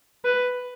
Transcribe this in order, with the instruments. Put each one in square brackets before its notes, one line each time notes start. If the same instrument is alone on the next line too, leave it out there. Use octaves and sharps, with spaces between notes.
[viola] B4